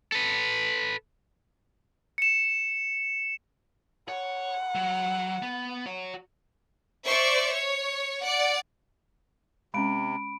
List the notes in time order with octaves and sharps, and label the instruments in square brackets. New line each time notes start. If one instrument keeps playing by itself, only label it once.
[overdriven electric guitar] A4 B4
[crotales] C#7 E7
[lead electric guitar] C#5 [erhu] F#5
[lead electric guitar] F#3
B3
F#4 C#5
[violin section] C5 D5 E5 C#6
C#5
D5 F#5
[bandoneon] C3 [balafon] G#3 C#4 [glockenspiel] B5 D7